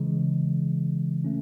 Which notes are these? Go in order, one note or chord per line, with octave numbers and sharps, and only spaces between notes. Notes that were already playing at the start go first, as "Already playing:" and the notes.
Already playing: C#3 E3 G#3
A3 C#4